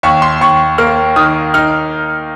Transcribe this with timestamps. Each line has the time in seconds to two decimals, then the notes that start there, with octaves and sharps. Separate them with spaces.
0.03 D#2 C#6
0.22 C6
0.41 D#2 C#6
0.78 A#3 F6
1.16 D#3 D#6
1.54 D#4 F6